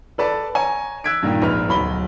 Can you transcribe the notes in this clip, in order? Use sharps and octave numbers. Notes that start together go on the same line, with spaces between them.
A4 B4 D5 A5
C#5 G#5 A#5
E6 F#6 G#6 B6 D7
G2 A#2 D#3 G5
A#1 G#2 B4 F6
D1 B1 B5 G7